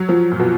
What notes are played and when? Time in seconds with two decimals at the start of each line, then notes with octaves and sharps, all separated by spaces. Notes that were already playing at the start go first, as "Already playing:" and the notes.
Already playing: F#3
0.09 F3
0.31 A#2
0.39 B2